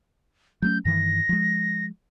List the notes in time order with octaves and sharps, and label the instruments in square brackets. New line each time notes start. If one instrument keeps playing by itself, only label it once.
[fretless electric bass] F#3 A3 C#4 [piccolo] G6
[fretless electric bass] G2 D#3 E3 [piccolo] A#6
[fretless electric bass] F3 G#3